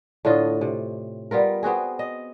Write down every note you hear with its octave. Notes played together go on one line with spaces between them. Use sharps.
A2 D3 F4 D#5
C3
G3 B3 F4 A#4
B3 C4 F#4 G#4
D#5